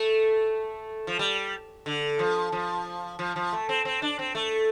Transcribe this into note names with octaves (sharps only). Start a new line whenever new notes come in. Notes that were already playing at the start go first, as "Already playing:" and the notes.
Already playing: A3
F3
G3
D3
F3
F3
F3
F3
A3
C4
C4
D4
C4
A3